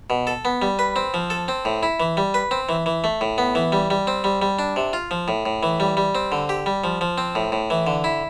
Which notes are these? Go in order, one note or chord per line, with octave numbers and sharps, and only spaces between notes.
B2
A4
B3
G3
B4
C4
F3
A4
C4
A2
E4
E3
G3
B4
C4
E3
E3
A3
A2
B3
E3
G3
G3
C4
G3
G3
D4
C3
F4
F3
A2
A2
E3
G3
G3
C4
D3
G4
G3
F3
F3
C4
A2
A2
E3
D3
E4